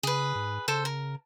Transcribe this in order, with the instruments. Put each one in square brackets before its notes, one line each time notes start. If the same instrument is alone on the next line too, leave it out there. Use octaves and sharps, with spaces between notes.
[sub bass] C#3 [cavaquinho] G#4 B4
[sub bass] G#2
[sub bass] C#3 [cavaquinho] A4 C5
[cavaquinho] A#4